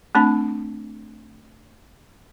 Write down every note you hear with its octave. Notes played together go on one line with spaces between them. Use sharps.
A3 C4 D4 A5